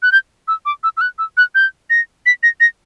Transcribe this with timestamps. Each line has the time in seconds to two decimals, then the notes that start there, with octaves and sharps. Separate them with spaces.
0.03 F#6
0.12 G6
0.48 E6
0.66 D6
0.83 E6
0.97 E6
1.01 F#6
1.19 E6
1.37 F#6
1.55 G6
1.90 A#6
2.26 B6
2.43 A#6
2.60 A#6